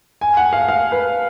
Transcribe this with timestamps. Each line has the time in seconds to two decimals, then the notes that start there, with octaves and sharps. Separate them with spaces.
0.21 G#5
0.37 F#5
0.53 F5
0.68 F5
0.92 B4